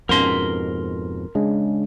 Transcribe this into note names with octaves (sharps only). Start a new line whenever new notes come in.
F2 G#2 B2 B3 C#4 A#4 C6
C#3 G#3 D4